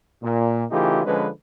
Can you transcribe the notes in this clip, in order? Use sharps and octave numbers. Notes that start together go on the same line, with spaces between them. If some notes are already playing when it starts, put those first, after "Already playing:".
A#2
C#3 E3 A3 D#4 F4 G4
D3 F3 G#3 C#4 B4